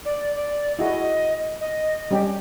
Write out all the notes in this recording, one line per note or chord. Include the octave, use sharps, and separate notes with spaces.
D5
D5
E4 F#4 G#4 D#5
D#5
G3 C#4 G4